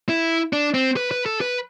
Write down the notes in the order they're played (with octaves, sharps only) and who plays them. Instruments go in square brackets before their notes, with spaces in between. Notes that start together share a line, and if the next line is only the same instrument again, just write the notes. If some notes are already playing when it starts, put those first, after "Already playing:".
[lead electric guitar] E4
D4
C4
B4
B4
A4
B4